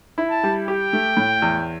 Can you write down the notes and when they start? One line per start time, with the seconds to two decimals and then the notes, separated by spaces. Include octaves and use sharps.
0.18 E4
0.30 A5
0.43 G3
0.68 G4 G5
0.93 A3
1.17 A2
1.42 E2